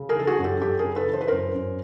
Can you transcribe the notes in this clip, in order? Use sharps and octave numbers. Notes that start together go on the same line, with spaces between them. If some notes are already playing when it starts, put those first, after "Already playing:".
Already playing: C#3
G#4 A#4
E3 A4
F#4 G#4
F#2
G4 A4
F#2 G4 A4
G#4 A#4
C#3
A4 B4
E3
C5
B4
F#2 A#4 C5
F#2